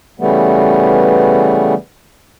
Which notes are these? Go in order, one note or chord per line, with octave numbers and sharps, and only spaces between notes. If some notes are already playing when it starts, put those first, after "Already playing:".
C#3 E3 G3 A3 B3